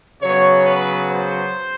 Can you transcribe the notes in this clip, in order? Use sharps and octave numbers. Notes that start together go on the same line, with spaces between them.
C#3 F#3 B3 C#5
B4
C5